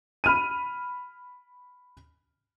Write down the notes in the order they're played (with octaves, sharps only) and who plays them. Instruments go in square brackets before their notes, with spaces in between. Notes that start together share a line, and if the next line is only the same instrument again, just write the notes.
[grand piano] B5 F6 D#7